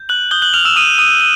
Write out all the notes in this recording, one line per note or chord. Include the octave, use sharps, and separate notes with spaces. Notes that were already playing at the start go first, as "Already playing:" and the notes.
Already playing: G6
F#6 F#7
D#6 F#6 G6 G7
F#6 F#7
F6 F7
E6 E7
D#6 D#7
D#6 D#7
D#7